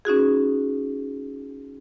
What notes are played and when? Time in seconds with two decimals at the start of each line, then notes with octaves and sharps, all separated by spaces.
0.05 C#4 D#4 F#4 G#4